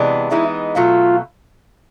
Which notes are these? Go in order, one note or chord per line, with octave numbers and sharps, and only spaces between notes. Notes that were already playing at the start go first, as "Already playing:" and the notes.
Already playing: C3 E3 G#3 B3 D4
E3 G#3 B3 D#4 E4
B2 F#3 A3 F4